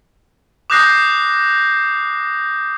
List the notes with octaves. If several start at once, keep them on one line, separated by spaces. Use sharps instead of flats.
D6 D#6 F#6 G6 A#6 C7